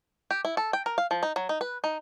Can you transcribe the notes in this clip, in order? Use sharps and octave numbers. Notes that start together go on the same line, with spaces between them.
G4
E4
A4
G5
A#4
F5
F3
D#4
F#3
D#4
B4
D#4